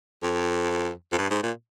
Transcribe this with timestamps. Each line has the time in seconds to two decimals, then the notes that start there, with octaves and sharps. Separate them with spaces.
0.23 F2
1.12 F2
1.18 G2
1.30 G#2
1.43 A#2